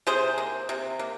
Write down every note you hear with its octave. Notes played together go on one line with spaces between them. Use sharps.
C3 G#4 C5
A#3
C3
A#3